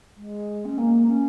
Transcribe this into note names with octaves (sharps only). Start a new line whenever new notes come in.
G#3
C#4
A#3
C#4